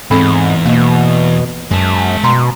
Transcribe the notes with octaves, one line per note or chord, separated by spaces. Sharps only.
E2 G#2 C4 A4 B5
B2 A#3 D#5
F#2 G#3 A5
B2 A#5 C6